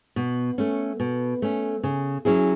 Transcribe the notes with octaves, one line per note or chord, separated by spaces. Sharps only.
B2
A3 C#4
B2
A3 C#4
C#3
F#3 C#4 E4 G#4